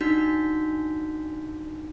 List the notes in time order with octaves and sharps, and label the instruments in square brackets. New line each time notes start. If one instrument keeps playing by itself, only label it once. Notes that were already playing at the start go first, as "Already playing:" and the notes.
[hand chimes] D4 D#4 F#4 G6 B6